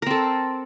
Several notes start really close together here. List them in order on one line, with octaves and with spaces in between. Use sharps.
A#4 C4 A4